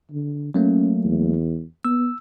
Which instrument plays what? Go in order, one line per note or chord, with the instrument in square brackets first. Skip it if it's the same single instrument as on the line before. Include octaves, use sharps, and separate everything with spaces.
[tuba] D3
[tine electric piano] F#3 A3 A#3 [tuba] C#4
[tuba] E2
[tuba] B3 [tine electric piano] E6